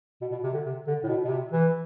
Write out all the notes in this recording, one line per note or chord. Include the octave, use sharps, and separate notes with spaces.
B2
B2
C3
D3
C3
D3
A2
B2
B2
C3
E3